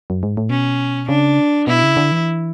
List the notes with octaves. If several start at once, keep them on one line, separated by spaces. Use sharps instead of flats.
F#2
G#2
A2
B2 C#4
C#3 D4
B2 E4
C#3
D3
E3